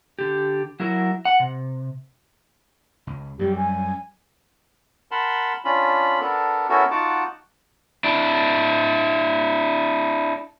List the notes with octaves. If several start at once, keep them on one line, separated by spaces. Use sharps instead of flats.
D3 G4
F#3 E4 F#4 A#4
F#5
C3
C#2
F#2 G3 G4
G#5
A#4 F#5 A5 B5 C6
C#4 D4 F4 B5
B3 D4 A4 A#4
B3 C#4 E4 F#4 A4 A#4
D#4 F4 F#4 F#5 A5 D6
D4 E4